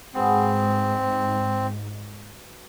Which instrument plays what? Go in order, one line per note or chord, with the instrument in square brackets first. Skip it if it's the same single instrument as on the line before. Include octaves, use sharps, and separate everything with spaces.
[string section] G#2 [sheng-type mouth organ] C4 [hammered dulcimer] F#4 G#4 B4